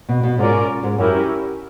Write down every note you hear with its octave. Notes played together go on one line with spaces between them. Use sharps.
B2
B2
G#2 C#4 F4 A#4 D5
G#2
F#2 C#4 E4 G4 A#4